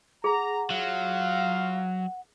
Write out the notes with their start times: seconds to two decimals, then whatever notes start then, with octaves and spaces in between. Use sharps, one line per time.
0.24 G#4 F#5 A#5
0.70 F#3 F4 F5